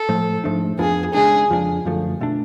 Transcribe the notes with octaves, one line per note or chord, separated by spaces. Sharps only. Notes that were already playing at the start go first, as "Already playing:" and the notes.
Already playing: A4
A2 F3 A3
G#2 F3 A3 D4
F2 F3 B3 D4 G#4
C#3 G#3 D4 G#4
F2 F3 B3 D4
F#2 D3 F3 A3
B2 A3 D4